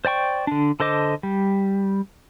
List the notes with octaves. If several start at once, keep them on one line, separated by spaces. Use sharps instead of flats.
C5 D5 G5 C#6
D3 D4
D3 A4 C5 D#5 D6
G3